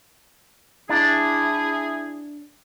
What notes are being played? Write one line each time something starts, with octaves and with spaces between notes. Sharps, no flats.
D4 E4 G#4